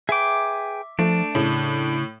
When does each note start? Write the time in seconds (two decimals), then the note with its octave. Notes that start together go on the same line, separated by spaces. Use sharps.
0.09 G#4 B4 E5 G5 D6
0.99 F3 A3 D4
1.35 A2 C#3